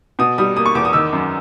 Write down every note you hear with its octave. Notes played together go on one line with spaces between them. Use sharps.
B2 D#6
G3 D#6
A#3 D#6
C#6
E2 D6
D#6
D#3 E6
F#2